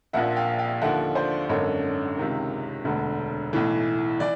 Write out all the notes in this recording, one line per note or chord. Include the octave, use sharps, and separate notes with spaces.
A#1 A#2 F3 E5 F#5
F5 G5
F5 G5
D#2 D3 F3 E5 F#5
C5 D5
G#1 F#2 D3 C#5 D#5
C#2 C3 D#3
E1 D2 D3
B1 A2 E3
E3 D5